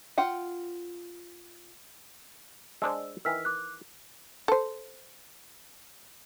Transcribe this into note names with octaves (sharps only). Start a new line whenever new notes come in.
F4 F#5 G5
G#3 D4 C5 E6
D#3 E3 E6 F6 B6
D6 F#6
A4 C5